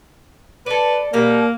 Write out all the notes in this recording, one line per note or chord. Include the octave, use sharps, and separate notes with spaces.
A4 B4 D5
B2 G3 A#3 D#4